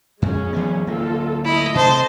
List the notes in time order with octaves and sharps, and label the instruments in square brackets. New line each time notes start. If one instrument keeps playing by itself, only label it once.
[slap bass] F2 [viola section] G#3 C#4
[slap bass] E3 F#3 B3
[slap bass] D1 A#3 [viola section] F4 A4
[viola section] A3 D#5 [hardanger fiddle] E4
[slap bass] C3 [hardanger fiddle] C5 A5